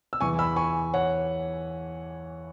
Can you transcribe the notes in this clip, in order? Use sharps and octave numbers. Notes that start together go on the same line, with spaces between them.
E6
E2 E3 G#5 C#6
B5 E6
G#5 C#6
C#5 F#5